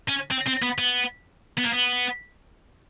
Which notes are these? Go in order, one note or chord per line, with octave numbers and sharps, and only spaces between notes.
C#4
C4
C4
B3
B3
B3
A#3
B3